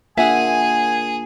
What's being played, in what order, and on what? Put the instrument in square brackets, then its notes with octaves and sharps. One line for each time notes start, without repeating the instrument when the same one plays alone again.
[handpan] A#3 D4 F4 [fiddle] G#4 [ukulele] E5 F#5 [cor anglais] G#5